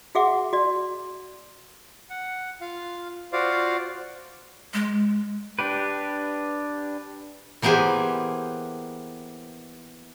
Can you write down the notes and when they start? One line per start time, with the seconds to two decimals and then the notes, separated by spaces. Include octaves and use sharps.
0.15 F#4 G#4 E5 F#5 D6
0.53 F#4 D5
2.10 F#5
2.61 F4 F5
3.33 F4 F#4 C5 D5 F5
4.74 G#3
5.59 D4 G4 B4
7.62 E3 A#3 B3 G4 G#4 C5